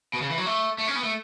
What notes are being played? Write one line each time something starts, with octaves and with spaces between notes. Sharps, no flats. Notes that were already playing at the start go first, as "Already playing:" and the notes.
B2
C#3
E3
F#3
A3
A3
C#4
B3
A3